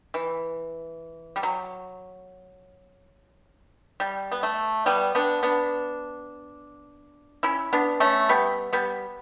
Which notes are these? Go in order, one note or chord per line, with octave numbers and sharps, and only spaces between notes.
E3
G3
F#3
G3
B3
A3
G3 B3
B3 D4
B3 D4
C#4 E4
B3 D4
A3 C#4
G3 B3
G3 B3